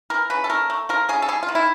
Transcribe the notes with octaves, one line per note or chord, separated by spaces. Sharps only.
E3 A#4
C#3 B4
A4
A3 A#4
A3
F3 A#4
C#3 G#4
A4
G3 G#4
F4
D#3
E4